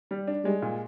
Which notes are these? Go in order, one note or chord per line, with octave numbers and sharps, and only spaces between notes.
G3
D4
G3 G#3
A#2